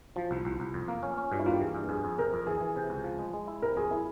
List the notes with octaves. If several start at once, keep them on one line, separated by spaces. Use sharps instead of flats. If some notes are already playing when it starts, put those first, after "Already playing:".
F3 F4
C2
C2
C2
F2
A#3
C#4
C#4
G2 F4
E4
A#3 F4
G4
E3 G#4
G2
F2 G#4
F2
C3 A#4
F2
E3 G#4
E3
C3
C#2
F3
G#3
G#3
E4
C3 A#4
F2 G#4
E4